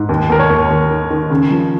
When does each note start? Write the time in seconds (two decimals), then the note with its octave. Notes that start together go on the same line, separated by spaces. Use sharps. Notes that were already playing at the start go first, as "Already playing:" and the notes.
Already playing: G#2
0.09 D#2
0.29 D#2 A#4
0.39 C#5
0.50 D#2
0.70 D#2
0.90 D#3
1.10 D#3
1.30 C#3
1.51 F3